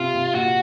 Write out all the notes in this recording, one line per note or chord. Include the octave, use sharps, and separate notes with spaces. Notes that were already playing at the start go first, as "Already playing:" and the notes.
Already playing: C3 F4
C3
A#2 F#4